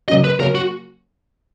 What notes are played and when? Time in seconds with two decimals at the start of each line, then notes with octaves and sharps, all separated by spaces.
0.08 C#3 F#3 A#3 C#4 F#4 D#5
0.24 B4
0.40 C#3 F#3 A#3 C#4 A#4
0.55 F#4